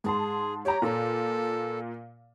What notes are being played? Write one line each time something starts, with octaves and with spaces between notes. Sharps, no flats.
G#2 G#4 A5 C6
G4 C#5 A#5
A#2 A4